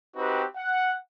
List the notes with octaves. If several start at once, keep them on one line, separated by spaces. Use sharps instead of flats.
C4 D#4 F#4 G4 B4
F#5